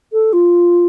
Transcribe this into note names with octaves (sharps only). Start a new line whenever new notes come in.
A4
F4